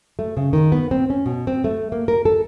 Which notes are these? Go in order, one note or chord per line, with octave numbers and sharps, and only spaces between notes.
A3
C#3
D#3
B3
C4
C#4
B2
C4
A3
A#3
A#4
A4